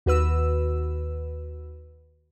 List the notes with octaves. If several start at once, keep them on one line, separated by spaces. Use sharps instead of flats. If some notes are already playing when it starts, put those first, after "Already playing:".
D#2 F#4 B4 E6